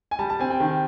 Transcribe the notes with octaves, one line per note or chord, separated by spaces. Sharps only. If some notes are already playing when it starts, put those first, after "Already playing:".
G#5
G3 A5
A5
C4 G#5
G5
D#3